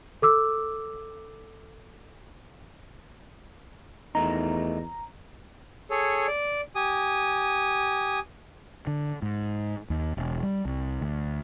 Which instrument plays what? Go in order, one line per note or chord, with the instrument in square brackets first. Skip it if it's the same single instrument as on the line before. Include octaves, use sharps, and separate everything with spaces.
[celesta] A4 D6 E6
[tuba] E2 [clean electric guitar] D#3 A3 D#4 [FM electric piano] A#5
[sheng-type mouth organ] G#4 A4 C#5
D5
G4 G#5 D#6
[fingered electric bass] D3
G#2
D#2
E1
G3
C2
D2